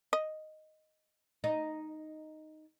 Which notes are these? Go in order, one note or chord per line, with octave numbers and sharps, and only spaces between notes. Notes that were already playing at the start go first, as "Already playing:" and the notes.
D#5
D#4